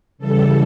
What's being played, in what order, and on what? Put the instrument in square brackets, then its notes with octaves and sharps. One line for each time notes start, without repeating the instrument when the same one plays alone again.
[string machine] C#3 E3 G3 A4